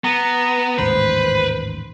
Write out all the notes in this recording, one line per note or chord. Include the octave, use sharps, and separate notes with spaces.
B3 A#5
A1 D#2 G#2 B4 C5